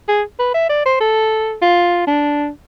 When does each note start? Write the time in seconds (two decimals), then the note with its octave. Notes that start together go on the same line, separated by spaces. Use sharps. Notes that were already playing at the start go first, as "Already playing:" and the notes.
0.08 G#4
0.39 B4
0.54 E5
0.69 D5
0.86 C5
1.00 A4
1.62 F4
2.07 D4